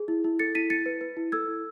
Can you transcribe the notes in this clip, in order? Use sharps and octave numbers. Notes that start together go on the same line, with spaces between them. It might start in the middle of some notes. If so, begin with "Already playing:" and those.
Already playing: G#4
E4
E4
A4 A6 C#7
E4 B6 D#7
E4 A6 C#7
B4
B4
E4
A4 E6 G#6
E4